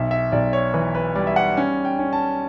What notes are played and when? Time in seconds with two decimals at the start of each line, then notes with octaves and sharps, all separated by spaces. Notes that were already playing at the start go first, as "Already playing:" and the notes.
Already playing: B1 E5
0.11 E5
0.32 B1 D5
0.53 C#5
0.74 E3 B4
0.95 B4
1.15 G3 D5
1.27 E5
1.36 F#5
1.57 C#4
1.85 G5
1.99 C#4
2.13 A5